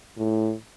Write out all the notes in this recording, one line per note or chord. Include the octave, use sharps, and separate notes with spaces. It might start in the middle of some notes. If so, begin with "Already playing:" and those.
A2